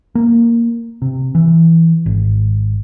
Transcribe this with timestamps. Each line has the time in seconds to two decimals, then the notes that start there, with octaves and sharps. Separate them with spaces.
0.15 A#3
1.02 C3
1.35 E3
2.06 G#1